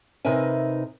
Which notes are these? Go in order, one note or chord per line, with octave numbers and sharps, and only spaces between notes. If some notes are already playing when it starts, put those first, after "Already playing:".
C3 D#4 A#4 B4 E5 G#5